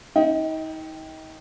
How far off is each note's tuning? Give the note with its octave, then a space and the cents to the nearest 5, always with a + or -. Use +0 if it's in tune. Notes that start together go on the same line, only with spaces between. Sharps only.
D#4 +35 D#5 +0 G5 +0